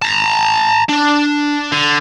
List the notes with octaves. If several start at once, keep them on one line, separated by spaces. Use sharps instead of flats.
A5 A#5
D4
D3